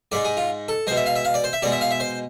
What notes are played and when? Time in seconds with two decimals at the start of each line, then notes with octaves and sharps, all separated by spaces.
0.12 G#2 G#3 D5
0.25 G#4
0.37 F4
0.68 A4
0.87 B2 G#3 C5
0.97 E5
1.06 F5
1.16 E5
1.25 F5
1.34 D5
1.44 C5
1.53 E5
1.62 B2 G#3 D5
1.72 E5
1.81 F5
1.91 E5
2.00 C5